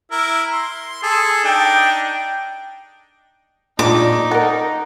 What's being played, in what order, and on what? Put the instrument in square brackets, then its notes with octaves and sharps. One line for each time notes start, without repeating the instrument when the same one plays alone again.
[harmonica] E4 A#4
C6
G#4 A4
[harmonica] D4 D#4 [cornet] G5
[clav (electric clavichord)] A#2 D4 F4 [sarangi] D#4 [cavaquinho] D6
[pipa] A4 A#4 [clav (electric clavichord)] F#5